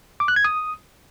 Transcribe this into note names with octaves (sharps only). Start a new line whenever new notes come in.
D6
F#6
G#6
D#6